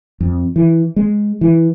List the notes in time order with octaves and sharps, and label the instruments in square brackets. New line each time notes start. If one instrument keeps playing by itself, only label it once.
[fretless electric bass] F2
E3
G#3
E3